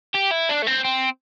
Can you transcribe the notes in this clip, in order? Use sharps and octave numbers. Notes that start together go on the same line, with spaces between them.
G4
E4
D4
A3
C4
C4